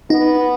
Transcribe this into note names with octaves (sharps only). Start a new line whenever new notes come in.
B3 D#4